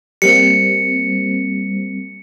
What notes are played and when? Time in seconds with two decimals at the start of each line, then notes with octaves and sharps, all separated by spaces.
0.22 G3 A#3 C4 C#7